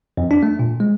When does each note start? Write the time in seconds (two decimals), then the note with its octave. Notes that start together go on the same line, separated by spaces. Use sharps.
0.17 F2
0.31 D4
0.43 A3
0.59 A#2
0.80 G#3